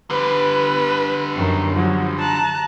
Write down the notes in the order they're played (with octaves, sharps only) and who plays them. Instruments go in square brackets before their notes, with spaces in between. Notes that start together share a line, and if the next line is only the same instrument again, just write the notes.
[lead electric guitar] D3 G3 [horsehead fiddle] B4
[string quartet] F#2 D#3
[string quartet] F3 [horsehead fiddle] F#3
[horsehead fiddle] A5 [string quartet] A#5 F#6